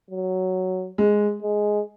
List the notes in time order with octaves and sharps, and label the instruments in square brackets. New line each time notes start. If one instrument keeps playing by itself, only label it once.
[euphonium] F#3
[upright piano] G#3
[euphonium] G#3